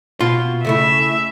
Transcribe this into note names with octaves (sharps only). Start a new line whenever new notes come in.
B2 F4
C#3 A3 E4 E5